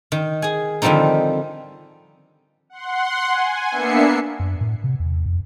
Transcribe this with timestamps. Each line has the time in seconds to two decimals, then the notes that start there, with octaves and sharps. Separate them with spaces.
0.12 D#3
0.42 G#4 G#5
0.82 D3 D#3 F3 G3 C4 D#4
2.70 F#5 C6
3.28 G#5
3.70 A#3 B3 D4 E5 C7 C#7
4.40 F#2
4.61 A2
4.84 C3
5.00 E2
5.26 F2